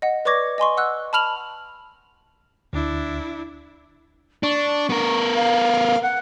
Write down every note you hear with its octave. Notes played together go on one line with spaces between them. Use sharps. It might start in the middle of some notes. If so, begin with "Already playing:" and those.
D#5 F#5
B4 D5 C#6 D6 G#6 A#6
D#5 G#5 C6 C#6
F#5 E6 F#6
A5 B5 F6 F7 F#7
D2 D4 E4
D4 C#6
B3 A#4
F5
F#5